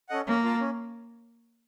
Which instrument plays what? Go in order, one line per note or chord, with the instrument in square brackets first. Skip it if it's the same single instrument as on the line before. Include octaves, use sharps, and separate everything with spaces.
[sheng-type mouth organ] C#4 A4 D#5 F#5
[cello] A#3 [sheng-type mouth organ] C#4
[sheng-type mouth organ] F4 A#4 F5 A5
C#4